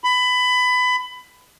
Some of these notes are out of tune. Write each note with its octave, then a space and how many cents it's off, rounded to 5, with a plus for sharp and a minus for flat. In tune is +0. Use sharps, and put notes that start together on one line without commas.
B5 +20